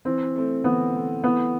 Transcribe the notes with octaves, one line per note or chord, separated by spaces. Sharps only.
E3 C4
A3 C4
E3 B3
A3 C4
E3 B3